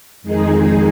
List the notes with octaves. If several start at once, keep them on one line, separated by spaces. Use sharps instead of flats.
F2 D#3 G#3 D#4 G#4